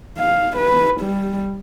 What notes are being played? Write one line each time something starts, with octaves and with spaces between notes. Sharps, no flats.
F5
B4
G3